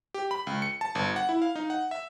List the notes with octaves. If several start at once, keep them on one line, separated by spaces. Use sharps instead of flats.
G4
B5
C#2
C#7
A5
G1
F#5
E4
F5
D#4
F#5
E5